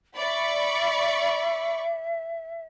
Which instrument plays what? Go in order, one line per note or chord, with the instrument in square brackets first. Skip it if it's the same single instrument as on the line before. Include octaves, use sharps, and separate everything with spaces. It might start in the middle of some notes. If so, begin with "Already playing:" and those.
[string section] D5 B5 C#6 [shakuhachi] E5